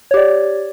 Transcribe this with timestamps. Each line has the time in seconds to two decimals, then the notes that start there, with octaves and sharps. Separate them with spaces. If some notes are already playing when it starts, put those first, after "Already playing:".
0.11 C#5
0.14 G4
0.17 D5